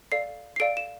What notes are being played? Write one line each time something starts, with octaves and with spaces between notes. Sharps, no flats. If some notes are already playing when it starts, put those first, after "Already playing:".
A4 D5 F5 C7
C7
A4 D5 F5 D7
E7